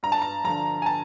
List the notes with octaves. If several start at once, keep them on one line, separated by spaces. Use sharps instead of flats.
G2 A#5
A5
A#5
D3 F3 A#5
G#5
A5